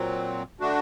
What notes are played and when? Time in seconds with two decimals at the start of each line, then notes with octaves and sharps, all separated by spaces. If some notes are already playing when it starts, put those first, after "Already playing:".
Already playing: A#2 F#3 C4
0.60 D3 A3 D4 F#4